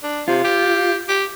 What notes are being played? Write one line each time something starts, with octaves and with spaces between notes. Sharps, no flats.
D4
C3 F4
G4
G4